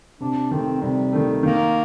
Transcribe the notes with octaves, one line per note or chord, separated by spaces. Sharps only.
C3 D4
D#3 A3 C4
C3 G3
D#3 A3
D#3 A#3